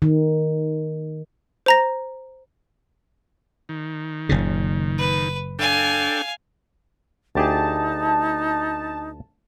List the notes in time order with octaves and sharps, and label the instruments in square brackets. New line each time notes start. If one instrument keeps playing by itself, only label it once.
[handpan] D#3
[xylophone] C5 A#5 A#6
[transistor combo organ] D#3
[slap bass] F#1 A#2 C#3
[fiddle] B4
[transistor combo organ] D4 A4 G5 [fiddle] F5 G#5
[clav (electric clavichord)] D2 G4 G#4 [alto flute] D#4 [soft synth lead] A5